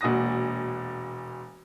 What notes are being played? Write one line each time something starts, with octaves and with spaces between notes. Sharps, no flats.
E1 A#2 F#4 D#6 A#6